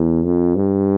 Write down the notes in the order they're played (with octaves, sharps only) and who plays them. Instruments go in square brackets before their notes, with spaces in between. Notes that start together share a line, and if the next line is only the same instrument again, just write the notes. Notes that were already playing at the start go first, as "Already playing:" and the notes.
Already playing: [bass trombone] E2
F2
G2